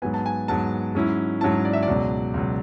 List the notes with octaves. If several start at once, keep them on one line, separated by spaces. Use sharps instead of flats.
G#2 F#3 B3 G#5
A5
G#5
G#2 F#3 B3 A5
G#2 F#3 C#4 E4
G#2 F#3 C#4 E4 A5
D5
E5
D5
C#2 B2 F#3
C#2 B2 F#3